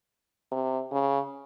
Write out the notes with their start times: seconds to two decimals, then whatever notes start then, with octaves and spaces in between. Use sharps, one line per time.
0.52 C3
0.92 C#3